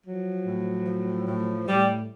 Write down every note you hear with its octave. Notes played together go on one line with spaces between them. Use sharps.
F3 F#3
A2
F3
A2
A2 G3